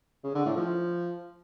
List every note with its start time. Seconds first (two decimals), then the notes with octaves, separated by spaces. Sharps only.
0.24 C#3
0.35 D3
0.45 A2
0.56 F3